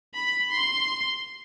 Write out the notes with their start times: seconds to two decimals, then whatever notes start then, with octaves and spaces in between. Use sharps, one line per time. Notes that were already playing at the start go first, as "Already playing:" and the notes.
0.15 B5
0.52 C6